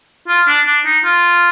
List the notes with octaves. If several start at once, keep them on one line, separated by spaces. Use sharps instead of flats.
F4
D4
D4
D#4
F4